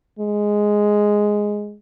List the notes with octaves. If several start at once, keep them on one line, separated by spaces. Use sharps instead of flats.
G#3